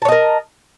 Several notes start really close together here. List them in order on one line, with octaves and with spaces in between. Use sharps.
A5 C#5 D#5 A#4